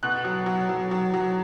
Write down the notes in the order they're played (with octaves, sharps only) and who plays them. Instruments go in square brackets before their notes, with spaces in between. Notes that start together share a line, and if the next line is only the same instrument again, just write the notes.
[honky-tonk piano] B2 F#6
F#3
F#3
F#3
F#3
F#3